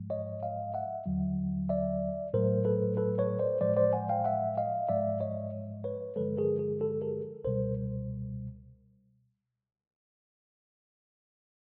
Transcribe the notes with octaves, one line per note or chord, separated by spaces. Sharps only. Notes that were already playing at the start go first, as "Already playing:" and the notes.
Already playing: G#2 F3 G#3
C#5 D#5
D#5 F5
E5 F#5
D#2 D3 F#3
D5 E5
A2 F#3 A3 A#4 C5
A4 B4
A4 B4
B4 C#5
C5 D5
A2 F3 G#3 C5 D5
C5 D5
F#5 G#5
F5 G5
E5 F#5
D#5 F5
G#2 F3 G#3 D5 E5
C#5 D#5
B4 C#5
G2 D3 F3 G#3 A4 B4
G#4 A#4
G#4
G4 A4
G#4 A#4
C#2 B2 G3 A#4 C5